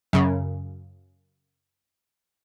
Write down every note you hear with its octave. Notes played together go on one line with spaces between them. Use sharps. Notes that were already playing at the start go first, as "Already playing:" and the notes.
F#2 C#3